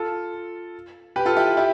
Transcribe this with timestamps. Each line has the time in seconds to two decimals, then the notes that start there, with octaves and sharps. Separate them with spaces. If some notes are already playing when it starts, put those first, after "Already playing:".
Already playing: F4 A4
1.16 G4 B4
1.26 F4 A4
1.37 E4 G4
1.57 E4 G4